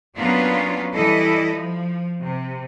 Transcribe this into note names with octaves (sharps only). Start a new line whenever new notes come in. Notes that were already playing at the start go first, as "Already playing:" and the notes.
F#3 A#3 B3 C#4 D4 F4
E3 G3 E4 A4 D#5
F3
C3